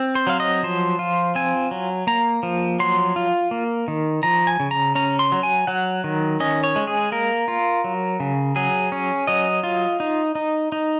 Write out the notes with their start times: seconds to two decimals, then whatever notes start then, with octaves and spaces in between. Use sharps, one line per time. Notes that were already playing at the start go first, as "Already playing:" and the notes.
Already playing: C4
0.15 C5
0.27 F#3 F5
0.40 D#5
0.63 F3 C5
0.99 F4
1.35 C4 G#5
1.71 F#3
2.07 A#3 A#5
2.43 F3
2.79 F#3 C6
3.16 F4
3.51 A#3
3.88 D#3
4.23 F3 A#5
4.47 G#5
4.60 C#3
4.71 A#5
4.95 C#4 A#5
5.19 C6
5.32 F#3
5.43 G#5
5.67 F#3 F#5
6.04 D#3
6.40 C#4 D#5
6.64 C#5
6.76 G#3
6.87 G#4
7.12 A#3 A#4
7.48 F4
7.84 F#3
8.20 C#3
8.56 F#3 G#4
8.92 C#4
9.27 F#3 D#5
9.63 F4
10.00 D#4
10.35 D#4
10.72 D#4